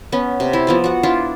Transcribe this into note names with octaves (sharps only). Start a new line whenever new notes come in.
B3 C#4
C3
E4
F3 B3 D5
F#4 F#5
D4 E4 F4